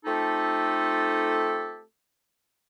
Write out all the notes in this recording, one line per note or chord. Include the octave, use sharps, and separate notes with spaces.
A3 C4 D#4 F4 G4 A4